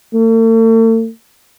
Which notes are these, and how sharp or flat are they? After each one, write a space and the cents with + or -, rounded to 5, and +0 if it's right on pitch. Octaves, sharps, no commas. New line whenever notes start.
A3 +45